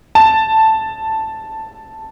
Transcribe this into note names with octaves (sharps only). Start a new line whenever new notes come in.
A5